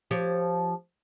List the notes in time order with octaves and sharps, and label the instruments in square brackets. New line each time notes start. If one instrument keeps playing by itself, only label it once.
[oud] F3 G4 C#5